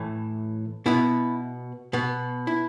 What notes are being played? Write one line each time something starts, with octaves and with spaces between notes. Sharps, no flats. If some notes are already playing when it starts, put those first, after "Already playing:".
Already playing: A2 E3 A3
B2 B3 E4
B2 B3
E4